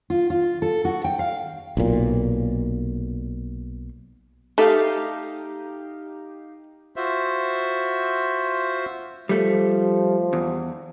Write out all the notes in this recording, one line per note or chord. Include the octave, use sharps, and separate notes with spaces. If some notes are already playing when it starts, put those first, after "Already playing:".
F4
F4
A4
F#4
G5
F5
B1 A#2
A3 D#4 G4 F5
F4 F#4 C5 E5
F3 G3 A3
E2